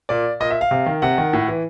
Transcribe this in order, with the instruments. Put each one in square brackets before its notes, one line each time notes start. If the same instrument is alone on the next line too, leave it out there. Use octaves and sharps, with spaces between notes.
[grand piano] A#2 D5
A#2 D#5
E5
F5
C3
D#3
C3 F#5
D#3
A2
E3